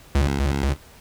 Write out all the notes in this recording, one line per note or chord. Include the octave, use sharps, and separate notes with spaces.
C#2